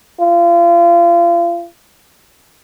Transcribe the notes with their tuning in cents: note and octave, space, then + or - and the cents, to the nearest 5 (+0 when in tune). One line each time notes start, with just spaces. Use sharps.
F4 -30